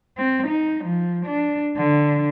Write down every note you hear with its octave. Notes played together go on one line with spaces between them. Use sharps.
C4
D#4
F3
D4
D3